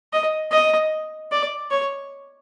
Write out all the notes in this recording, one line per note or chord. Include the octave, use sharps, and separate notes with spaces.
D#5
D#5
D5
C#5